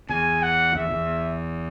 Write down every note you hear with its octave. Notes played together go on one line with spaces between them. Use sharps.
E2 G#5
F#5
E2 E5
E2